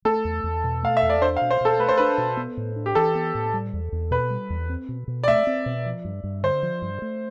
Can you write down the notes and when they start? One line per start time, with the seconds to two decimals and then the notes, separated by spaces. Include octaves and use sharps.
0.05 A3 A4
0.25 E2
0.44 E2
0.64 B2
0.83 A3 F5
0.97 E5
1.02 E2
1.10 D5
1.21 D4 C5
1.37 F5
1.41 B2
1.51 C5
1.61 B2 A4
1.79 A3 B4
1.89 C5
1.98 D4 B4
2.18 B2
2.37 B3
2.57 A2
2.76 D4
2.86 G4
2.95 E3 A4
3.15 B3
3.35 A2
3.54 G3
3.73 E2
3.92 E2
4.11 B2 B4
4.30 G3
4.50 E2
4.69 C4
4.89 B2
5.07 B2
5.24 D5
5.28 A3 E5
5.47 C4
5.66 B2
5.86 F3
6.05 G2
6.24 G2
6.43 D3 C5
6.63 F3
6.82 G2
7.02 A3